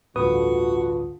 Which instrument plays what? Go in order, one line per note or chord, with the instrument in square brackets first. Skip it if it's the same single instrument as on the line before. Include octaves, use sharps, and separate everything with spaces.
[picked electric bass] A1 D2 G2 [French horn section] D3 F4 [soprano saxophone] F#4 [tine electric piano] B4 D#6